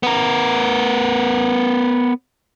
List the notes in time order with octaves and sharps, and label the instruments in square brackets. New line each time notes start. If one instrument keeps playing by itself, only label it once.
[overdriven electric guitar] B3 A#4